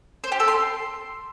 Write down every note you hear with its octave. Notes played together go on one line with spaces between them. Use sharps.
C5
G4
A4
C6